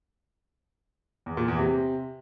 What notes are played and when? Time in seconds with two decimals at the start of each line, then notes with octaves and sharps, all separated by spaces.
1.26 E2
1.37 A#2
1.48 E2
1.59 C3